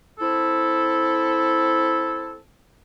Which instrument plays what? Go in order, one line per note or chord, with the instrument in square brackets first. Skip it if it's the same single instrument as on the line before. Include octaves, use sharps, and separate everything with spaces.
[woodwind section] C4 E4 A4